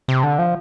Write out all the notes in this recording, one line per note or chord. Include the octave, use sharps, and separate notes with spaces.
C3
D3
F3